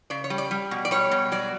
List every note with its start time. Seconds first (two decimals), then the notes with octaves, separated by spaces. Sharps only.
0.10 C#3 D5
0.24 C#5
0.30 G3
0.38 D5
0.51 G3
0.71 B2
0.85 D5
0.91 G3 C#5
1.11 B2
1.32 F#3 D5